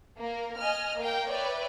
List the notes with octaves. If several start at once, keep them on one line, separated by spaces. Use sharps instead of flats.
A#3 A#4
D#5 G#5 F6
A#3 A#4 F5 G5
B4 C#5 D5 E5 G5